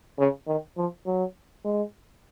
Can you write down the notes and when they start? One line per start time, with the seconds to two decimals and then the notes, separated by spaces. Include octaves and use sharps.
0.19 C#3
0.47 D#3
0.77 F3
1.06 F#3
1.65 G#3